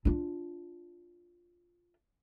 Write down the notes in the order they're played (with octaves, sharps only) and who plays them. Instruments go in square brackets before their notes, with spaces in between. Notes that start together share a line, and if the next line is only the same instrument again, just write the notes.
[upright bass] D4 F4